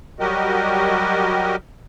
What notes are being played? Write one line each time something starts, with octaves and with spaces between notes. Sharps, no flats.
F#3 G3 F#4 G4 A#4 D#5